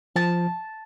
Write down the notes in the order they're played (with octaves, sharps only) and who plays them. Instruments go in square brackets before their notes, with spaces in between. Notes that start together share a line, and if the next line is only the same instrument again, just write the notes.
[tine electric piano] F3 [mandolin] A5